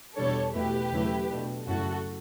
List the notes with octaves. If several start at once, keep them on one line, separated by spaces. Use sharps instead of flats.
E2 B2 G3 D4 A4 C#5
E2 B2 A3 E4 G4 B4
E2 C#3 F#3 A3 E4
B2 A3 D4
F#2 C#3 F#3 A3 E4 F#4 A4